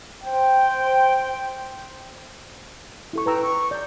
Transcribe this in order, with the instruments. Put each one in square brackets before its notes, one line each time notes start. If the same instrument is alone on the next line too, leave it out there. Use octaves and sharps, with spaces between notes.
[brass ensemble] C5 G5
[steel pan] E4 A4 C#6
[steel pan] B4 A#5 E6 [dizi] G5
[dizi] C#6
[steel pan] D5 [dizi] G6